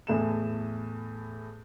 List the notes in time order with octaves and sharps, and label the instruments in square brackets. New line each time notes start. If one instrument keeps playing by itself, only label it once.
[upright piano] E2 A2 A3 E7